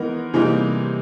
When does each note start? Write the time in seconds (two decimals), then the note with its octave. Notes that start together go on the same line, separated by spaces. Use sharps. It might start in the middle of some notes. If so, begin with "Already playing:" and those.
Already playing: E3 G#3 B3 D#4 A#4
0.33 C3 E3 G3 A#3 D#4 G#4